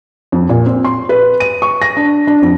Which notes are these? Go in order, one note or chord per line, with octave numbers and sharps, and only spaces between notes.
F2
A#2
C4
C6
B4
D#7
C#6
A#6
D4
D4
F2